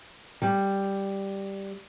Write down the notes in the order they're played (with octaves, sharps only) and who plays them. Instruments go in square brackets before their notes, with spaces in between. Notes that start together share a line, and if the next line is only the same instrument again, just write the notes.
[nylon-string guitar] G3